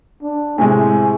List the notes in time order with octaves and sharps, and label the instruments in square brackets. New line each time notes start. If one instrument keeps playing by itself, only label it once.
[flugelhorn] D4
[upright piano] A2 C3 G#3 [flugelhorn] G#5